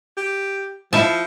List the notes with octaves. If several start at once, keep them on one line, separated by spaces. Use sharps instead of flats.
G4
F3 E4 E5 A5